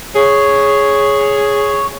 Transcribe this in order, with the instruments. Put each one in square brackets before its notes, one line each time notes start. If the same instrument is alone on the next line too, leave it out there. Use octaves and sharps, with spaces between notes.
[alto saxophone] G#4 [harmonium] C#5